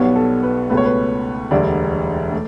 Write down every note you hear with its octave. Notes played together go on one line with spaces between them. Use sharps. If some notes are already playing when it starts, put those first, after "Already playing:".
Already playing: B1 B2 G3 B3 C#5
A4
B4
C#2 B2 A3 B4
C#5
B4
E1 D2 D3 G3 D5
A3